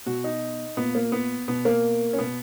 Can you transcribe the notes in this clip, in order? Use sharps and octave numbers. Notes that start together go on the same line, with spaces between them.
B2 F#4
D#4
A#2 B3
A#3
B3
B2 B3
A#3
C#4
B2 B3